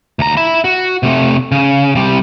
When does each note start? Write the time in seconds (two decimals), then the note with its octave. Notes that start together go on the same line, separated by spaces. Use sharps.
0.19 D2 A#5
0.37 E5 B5
0.65 F#4
1.03 C3 A3
1.52 C#3
1.95 C3 G3